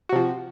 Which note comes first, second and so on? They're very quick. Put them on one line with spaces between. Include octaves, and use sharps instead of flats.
F#4 C3 F3